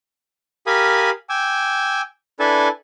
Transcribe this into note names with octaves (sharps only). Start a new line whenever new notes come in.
G4 A#4 F5 G#5 B5 D#6
G5 G#5 D6 E6
D4 E4 A4 B4 G#5 A5